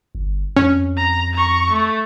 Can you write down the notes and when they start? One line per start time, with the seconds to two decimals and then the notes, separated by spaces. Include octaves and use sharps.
0.15 G1
0.56 F2 C#4
0.97 A#5
1.33 A#5 C#6
1.70 A3